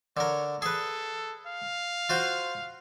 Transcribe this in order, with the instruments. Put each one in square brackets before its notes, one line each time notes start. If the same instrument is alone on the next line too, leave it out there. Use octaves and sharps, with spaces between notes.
[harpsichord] D3 A#4 [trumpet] C#5
[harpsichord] G#4 B4 [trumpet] A4
[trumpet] F5
[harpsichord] F4 F#4 C5